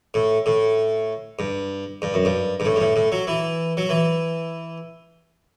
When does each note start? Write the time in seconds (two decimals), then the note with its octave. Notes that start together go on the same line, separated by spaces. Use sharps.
0.14 A2
0.46 A2
1.39 G2
2.02 G2
2.14 F#2
2.25 G2
2.60 G2
2.65 A2
2.76 G2
2.81 A2
2.96 A2
3.12 F#3
3.27 E3
3.77 F#3
3.89 E3